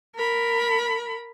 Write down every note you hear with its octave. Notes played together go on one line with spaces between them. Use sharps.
A#4 B5